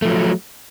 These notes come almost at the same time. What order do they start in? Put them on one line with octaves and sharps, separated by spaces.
A3 F3 F#3